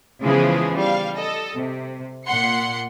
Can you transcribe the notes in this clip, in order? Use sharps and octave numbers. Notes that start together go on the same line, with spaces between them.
C#3 E3 F3 G#3 B3 G#4
G3 F5
A4 D#5
C3
A#2 F#5 C6 C#7